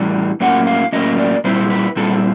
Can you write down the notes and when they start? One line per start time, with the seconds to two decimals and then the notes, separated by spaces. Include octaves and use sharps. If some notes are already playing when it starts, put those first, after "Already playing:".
Already playing: A2 E3 G3
0.40 A2 F#3 A#3 C#4 F#5
0.67 F5
0.92 A2 F#3 A#3 C#4 D#5
1.18 D5
1.44 A#2 G3 C4 E4 C5
1.70 B4
1.96 A#2 G3 C4 E4 A4